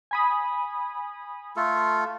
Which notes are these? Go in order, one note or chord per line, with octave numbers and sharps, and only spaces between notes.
G#5 B5 D#6
A3 F4 A4